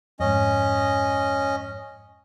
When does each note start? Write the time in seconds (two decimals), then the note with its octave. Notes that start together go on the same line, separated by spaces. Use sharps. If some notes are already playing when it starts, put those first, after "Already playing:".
0.20 F2 G#2 C#4 D#5